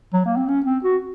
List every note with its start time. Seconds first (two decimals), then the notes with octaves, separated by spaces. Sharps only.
0.13 F#3
0.26 A#3
0.37 C4
0.48 C#4
0.66 C4
0.84 F#4